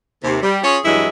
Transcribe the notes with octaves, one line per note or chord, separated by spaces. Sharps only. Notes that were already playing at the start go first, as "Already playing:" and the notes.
D#2 C3
G3
C#4 F4 G#4 C#5
G2 E3 F#3 G#3 E4